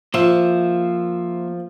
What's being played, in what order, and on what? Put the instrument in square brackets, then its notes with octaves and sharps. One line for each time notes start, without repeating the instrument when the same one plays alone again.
[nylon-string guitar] F3 [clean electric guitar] A#3 C5 E5